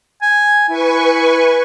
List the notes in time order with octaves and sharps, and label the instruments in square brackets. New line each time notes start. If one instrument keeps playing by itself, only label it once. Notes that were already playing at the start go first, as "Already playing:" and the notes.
[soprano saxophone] G#5
[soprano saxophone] E4 [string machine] B4 G#5 C#6